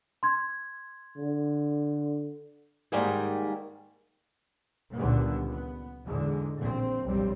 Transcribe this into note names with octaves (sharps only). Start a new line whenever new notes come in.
C6 G#6
D3
G#2 D#3 G3 A#3 G#4
C#2 A#2 D3 D#3 G3 B3
B3
E2 G#2 D3 G#3
A#1 C4
F1 B1 G2 G3 C4